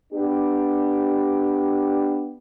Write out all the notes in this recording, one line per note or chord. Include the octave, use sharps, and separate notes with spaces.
B3 D4 G4